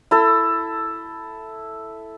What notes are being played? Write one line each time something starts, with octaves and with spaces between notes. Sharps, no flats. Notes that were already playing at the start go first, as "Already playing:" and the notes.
E4 A4